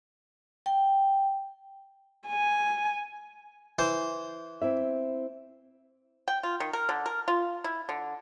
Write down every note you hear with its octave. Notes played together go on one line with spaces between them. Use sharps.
G5
G#5
E3 C5
C4 E4 E5
G5
F4
D#3
A#4
D3
A#4
F4
E4
D3